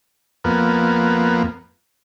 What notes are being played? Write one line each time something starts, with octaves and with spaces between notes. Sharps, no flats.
F2 A#3 B3